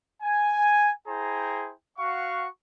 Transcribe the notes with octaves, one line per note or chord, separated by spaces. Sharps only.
G#5
E4 G#4 C5 G5 G#5 A#5
F#4 F5 F#5 C#6